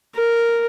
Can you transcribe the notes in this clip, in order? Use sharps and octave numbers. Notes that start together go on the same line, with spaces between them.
A#4